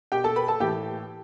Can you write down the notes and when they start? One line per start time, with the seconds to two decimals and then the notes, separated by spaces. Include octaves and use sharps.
0.12 B2 G4 G5
0.24 A4 A5
0.36 B4 B5
0.48 A4 A5
0.60 A2 E3 G4 G5